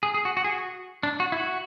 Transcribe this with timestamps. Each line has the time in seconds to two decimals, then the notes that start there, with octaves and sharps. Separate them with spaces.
0.03 G#4
0.14 G#4
0.25 F#4
0.37 F#4
0.44 G#4
0.52 F#4
1.03 D4
1.20 F#4
1.32 E4
1.37 F#4